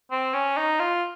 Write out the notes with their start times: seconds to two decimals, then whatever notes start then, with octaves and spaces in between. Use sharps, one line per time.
0.11 C4
0.34 C#4
0.57 D#4
0.80 F4